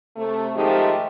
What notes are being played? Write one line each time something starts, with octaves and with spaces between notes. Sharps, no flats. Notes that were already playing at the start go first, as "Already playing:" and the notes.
C3 A3
G#2 D#3 F3 G#3 A3 G4